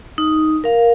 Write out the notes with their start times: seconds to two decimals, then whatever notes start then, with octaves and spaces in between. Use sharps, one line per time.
0.18 D#4
0.64 A#4 F5